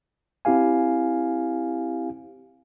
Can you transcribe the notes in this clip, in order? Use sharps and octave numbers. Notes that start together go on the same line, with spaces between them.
C4 E4 G4 F5 G#5